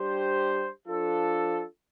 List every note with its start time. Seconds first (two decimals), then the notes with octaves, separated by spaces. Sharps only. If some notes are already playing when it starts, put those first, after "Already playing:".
Already playing: G3 D4 G4 C5
0.87 F3 D4 F4 A4